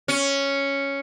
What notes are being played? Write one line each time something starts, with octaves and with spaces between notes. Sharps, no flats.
C#4